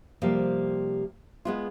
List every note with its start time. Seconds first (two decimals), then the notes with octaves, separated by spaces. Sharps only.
0.22 C3 F3 G3 A#3
1.45 G#3 B3 F4